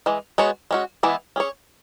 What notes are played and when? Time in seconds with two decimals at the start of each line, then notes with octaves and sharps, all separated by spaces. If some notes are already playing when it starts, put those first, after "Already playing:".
0.06 E3 G#3
0.38 G#3 B3 F#4 C#5
0.71 G#3 C#4 F#4
1.03 E3 G#3 B3 E4
1.36 C#4 G#4 C#5